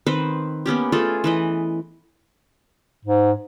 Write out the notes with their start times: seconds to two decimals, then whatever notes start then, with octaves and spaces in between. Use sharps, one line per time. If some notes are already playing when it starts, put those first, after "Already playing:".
0.07 D#3 C4 B4 C5
0.66 A#3 B3 C#4 G4
0.92 A3 F4 G#4 A4
1.24 E3 B4 D#5
3.05 G#2